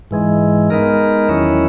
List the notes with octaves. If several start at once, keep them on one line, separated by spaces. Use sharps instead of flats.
G#2 E3 G#3
G#3 B3 D#4 A#4
E2 D#3 F#3 C#4 E4